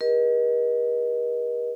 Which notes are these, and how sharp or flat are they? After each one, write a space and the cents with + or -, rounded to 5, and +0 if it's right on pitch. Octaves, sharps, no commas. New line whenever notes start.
G4 +40 A#4 +45 D#5 +0